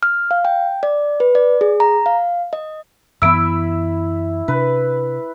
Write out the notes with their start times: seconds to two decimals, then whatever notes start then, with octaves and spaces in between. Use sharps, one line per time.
0.03 F6
0.31 F5
0.45 G5
0.83 D5
1.20 B4
1.35 D5
1.61 G#4
1.80 A#5
2.06 F5
2.53 D#5
3.22 F#2 E3 B3 E4 B5 E6 D7
4.48 C3 D4 B4